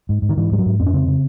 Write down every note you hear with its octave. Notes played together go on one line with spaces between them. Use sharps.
G#2
G#2
D#3
G#2 E3
G#2 G3
F#3
G#2
F2 C4
C#4
C#3 C4
C#3